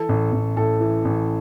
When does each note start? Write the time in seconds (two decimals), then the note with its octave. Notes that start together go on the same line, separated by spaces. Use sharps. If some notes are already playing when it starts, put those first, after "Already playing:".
Already playing: E3 A4
0.09 A1
0.32 A1
0.56 A2 A4
0.80 E3
1.05 A1